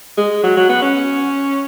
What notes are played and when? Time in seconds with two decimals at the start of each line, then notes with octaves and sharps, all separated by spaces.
0.18 G#3
0.43 F#3
0.57 F#3
0.69 B3
0.82 C#4